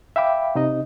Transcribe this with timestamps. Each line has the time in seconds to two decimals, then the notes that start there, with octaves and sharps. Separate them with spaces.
0.16 E5 F5 G5 B5 D6
0.55 C3 D#4 D#5